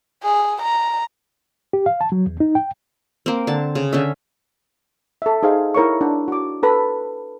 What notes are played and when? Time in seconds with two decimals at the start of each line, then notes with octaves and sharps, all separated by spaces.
0.24 G#4
0.62 A#5
1.73 G4
1.86 F5
2.01 A5
2.12 F#3
2.27 E2
2.40 D#4
2.55 G5
3.26 A#3 C4
3.47 D3 A5
3.75 C#3
3.93 D3 C#4 E5
5.22 A4 E5
5.43 D#4 G#4 C5 F5
5.74 E4 A#4 C#5 C#6
6.01 D4
6.28 F#4 D6
6.63 A4 B4 B5